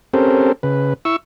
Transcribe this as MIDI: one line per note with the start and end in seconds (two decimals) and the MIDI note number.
0.14 0.52 60
0.14 0.52 61
0.14 0.52 67
0.14 0.52 69
0.14 0.52 70
0.14 0.52 72
0.63 0.93 49
0.63 0.93 71
1.05 1.16 64
1.05 1.16 85
1.05 1.16 88